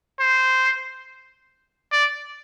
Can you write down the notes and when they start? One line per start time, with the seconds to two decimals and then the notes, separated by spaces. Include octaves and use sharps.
0.20 C5
1.92 D5